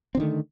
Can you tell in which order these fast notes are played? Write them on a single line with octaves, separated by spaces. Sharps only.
C4 D3 D#3 A3